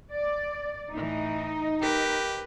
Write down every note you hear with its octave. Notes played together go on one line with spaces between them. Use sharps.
D5
A2 E3 D#4
G4 A#4 B4